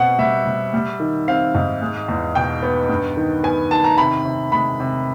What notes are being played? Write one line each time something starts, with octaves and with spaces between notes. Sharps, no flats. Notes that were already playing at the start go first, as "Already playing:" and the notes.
Already playing: B2 C4 F#5
G3 E5
G3
G3
D#3
C4 F5
G#2
G#3
E2
B2 G5
B3
G2
D#3
B3 G#5
D#3 A5
A#5
C3 B5
C3
G#3 B5
C3